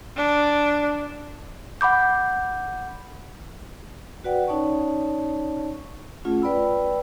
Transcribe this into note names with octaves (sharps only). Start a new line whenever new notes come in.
D4
F#5 B5 D6 G6
F#4 B4 D5 F#5 G5
C#4 D#4 C#5 D5 A5 C#6
A3 C#4 F4 G#4 F#5
B4 D5 G5 B5 E6